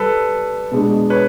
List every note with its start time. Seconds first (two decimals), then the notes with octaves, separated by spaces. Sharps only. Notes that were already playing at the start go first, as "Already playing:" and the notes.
Already playing: G3 A4 B4
0.71 B2 G#3 B3 D4
1.10 B4 C#5